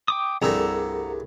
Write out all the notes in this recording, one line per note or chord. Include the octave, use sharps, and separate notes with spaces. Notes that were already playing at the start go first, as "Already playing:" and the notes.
G5 D6 D#6
C2 G2 A3 G#4 A#4 F#5 A#5 E6